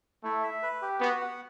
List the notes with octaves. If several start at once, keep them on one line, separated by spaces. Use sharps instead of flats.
A3 E4
E5
B4
G4
B3 F#4
F#5